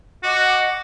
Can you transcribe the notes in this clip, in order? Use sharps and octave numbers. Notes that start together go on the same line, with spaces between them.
F#4 D#5 F#5 D6